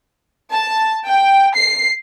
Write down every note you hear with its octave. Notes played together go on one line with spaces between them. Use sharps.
A5
G5
C7